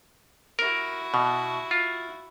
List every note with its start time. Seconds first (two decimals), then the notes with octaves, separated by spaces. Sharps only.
0.59 E4 F#4 A#4
1.14 B2
1.71 F4